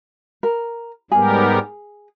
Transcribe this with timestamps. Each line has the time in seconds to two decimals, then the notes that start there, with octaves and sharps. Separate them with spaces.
0.43 A#4
1.11 G#2 G3 B3 G4 G#4 A#4